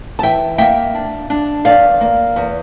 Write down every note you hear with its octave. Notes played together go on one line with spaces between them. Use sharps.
A5
E3 E5 G5
A#3 E5 G5
D4
D4
E2 D5 F5
A#3
E2